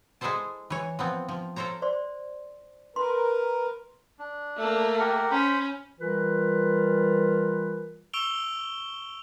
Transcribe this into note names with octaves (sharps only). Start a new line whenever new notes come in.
G#3 E4 G#4 A4 C5 A5
E3 C#5
F3 B3 C4
F3
A4 A#4 C5 C#5 A#5
C5 D5 C6
A#4 B4 C6
D4
A3 A#3
G4 A#4 F#5
C#4 C5 B5
E3 G3 F4 A#4 B4
C#6 E6 D7 F7 G7